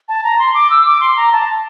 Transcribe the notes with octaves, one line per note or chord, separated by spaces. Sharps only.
A5
A#5
C6
D6
E6
D6
C6
A#5
A5